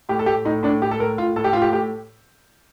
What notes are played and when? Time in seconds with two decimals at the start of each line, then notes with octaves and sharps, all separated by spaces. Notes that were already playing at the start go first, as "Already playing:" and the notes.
0.09 A2 G4
0.19 A4
0.26 A2 G4
0.45 A2 D#4
0.63 A2 D4
0.82 A2 G4
0.91 A4
1.00 A2 A#4
1.18 A2 F4
1.36 A2 A4
1.44 G4
1.53 A2 F4
1.62 G4
1.72 A2 G4